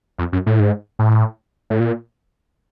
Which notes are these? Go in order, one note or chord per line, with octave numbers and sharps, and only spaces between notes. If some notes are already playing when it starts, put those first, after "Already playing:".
F2
F#2
A2
G#2
A2
A2
A#2